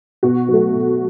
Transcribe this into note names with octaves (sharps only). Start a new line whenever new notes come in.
B2 F#4
F#3 A3
B2